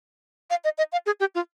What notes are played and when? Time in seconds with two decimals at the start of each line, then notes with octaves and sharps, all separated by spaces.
0.50 F5
0.64 D#5
0.78 D#5
0.92 F5
1.06 G#4
1.20 G4
1.35 F4